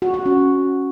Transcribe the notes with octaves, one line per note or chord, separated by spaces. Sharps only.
F#4
F#4
C#4